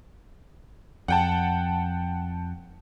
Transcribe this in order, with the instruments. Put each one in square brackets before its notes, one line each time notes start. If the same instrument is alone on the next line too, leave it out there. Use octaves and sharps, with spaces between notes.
[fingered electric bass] F2 [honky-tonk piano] F#5 G5 A5